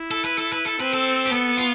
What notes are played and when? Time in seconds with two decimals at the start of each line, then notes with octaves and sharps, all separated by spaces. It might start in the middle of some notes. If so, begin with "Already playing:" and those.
Already playing: E4
0.11 A4
0.25 B4
0.38 A4
0.53 B4
0.66 A4
0.80 C4 B4
0.94 A4
1.25 G4
1.31 B3 A4
1.57 F4